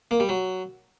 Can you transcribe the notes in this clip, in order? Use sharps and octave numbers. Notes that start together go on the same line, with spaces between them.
A#3
G3
F#3